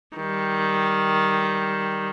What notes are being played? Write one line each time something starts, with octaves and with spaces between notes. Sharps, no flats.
D#3 G3